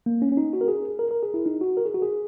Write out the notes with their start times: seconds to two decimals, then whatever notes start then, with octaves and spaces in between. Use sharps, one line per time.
0.06 A#3
0.22 C#4
0.32 C#4
0.37 D#4
0.53 F#4
0.61 A#4
0.68 G#4
0.99 A#4
1.11 A#4
1.23 G#4
1.34 E4
1.46 D#4
1.61 F#4
1.77 A#4
1.85 G#4
1.94 F#4
2.02 G#4